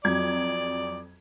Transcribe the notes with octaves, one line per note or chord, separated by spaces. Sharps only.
F2 F#3 D5 G#6